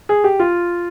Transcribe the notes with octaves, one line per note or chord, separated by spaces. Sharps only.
G#4
G4
F4